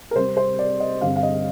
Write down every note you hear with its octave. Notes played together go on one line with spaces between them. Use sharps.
A#4
C3 G3 C4 C5
C5
D5
D#5
G2 D3 G3 C4 F5
F5
D#5